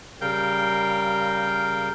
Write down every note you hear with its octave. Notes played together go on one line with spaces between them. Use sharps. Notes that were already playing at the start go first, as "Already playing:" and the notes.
C#3 G3 A#4 F5 G5 G6